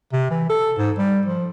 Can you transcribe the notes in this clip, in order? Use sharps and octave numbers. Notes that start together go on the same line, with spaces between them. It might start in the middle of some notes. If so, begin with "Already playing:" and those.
C3
E3
A4
G#2
G3
F3